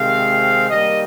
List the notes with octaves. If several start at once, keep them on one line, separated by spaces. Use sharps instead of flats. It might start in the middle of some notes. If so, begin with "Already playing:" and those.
Already playing: C3 D#3 G#3 C4 F5
D#3 G3 A#3 D#5